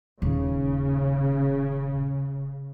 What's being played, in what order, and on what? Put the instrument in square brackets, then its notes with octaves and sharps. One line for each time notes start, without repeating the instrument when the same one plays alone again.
[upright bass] D#1 [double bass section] C#3